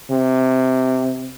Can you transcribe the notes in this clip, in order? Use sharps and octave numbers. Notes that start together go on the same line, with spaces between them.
C3